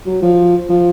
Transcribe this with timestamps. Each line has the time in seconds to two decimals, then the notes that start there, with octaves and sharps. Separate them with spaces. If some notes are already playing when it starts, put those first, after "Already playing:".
0.07 F#3
0.22 F3
0.69 F3